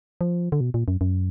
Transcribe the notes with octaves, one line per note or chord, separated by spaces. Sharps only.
F3
D3
B2
A#2
F#2
F#2